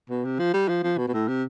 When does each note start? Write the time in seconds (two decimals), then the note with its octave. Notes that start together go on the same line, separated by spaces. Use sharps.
0.09 B2
0.25 C3
0.39 F3
0.53 G3
0.68 F3
0.83 F3
0.98 B2
1.08 B2
1.14 A2
1.28 C3